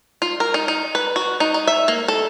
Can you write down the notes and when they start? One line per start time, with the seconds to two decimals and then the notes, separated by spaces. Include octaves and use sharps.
0.22 F4
0.40 A#4
0.54 D#4
0.68 D#4
0.95 B4
1.16 F#4
1.40 D#4
1.54 D#4
1.67 E5
1.88 A#3
2.08 A4